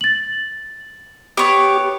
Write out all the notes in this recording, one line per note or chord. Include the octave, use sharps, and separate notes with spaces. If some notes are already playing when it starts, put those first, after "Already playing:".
A6 F#7
B3 G4 C#5 D6